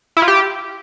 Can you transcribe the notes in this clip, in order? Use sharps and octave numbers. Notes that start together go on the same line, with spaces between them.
E4
F4
G4